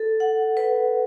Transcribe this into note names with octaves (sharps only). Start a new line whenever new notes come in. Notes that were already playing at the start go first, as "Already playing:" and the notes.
Already playing: A4
F#5
B4